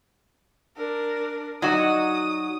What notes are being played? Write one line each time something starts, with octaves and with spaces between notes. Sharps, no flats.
D4 A#4
F#3 D#4 F#4 D5 D#6